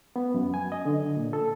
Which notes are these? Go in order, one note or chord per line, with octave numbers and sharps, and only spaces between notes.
B3
F#2
G#5
D#5
D3
A#2
A4